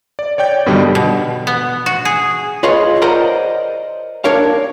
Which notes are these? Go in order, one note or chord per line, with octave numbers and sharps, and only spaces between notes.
D5
C#5 D5 G5 G6
G2 B2 D3 D#3 G3
B2
B3
F#4
G#4
F4 G#4 B4 C#5 D#5 F5
A#4 C5 D5 D#5 F#5 A#5
D4 A#4 C#5 F5